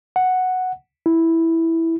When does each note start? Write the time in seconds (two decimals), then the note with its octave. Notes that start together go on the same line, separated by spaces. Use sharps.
0.16 F#5
1.06 E4